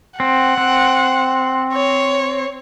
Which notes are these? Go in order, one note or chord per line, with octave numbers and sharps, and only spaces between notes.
C4 F#5
C4
C#5